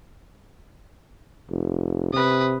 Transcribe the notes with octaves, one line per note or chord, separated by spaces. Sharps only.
F1
C3 B4 D#6